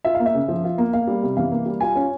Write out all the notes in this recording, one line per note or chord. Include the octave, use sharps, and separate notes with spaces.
F4 E5
A#3 F5
E5
C#3
F3
F4
A#3
A#3 F5
G3
C3
E3 F5
A#3
G3
F4 G#5
C#4